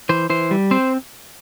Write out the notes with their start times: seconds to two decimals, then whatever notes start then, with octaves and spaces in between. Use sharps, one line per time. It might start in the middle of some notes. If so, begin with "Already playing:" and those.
0.09 E3 C5
0.30 E3 C5
0.51 G3
0.71 C4 C5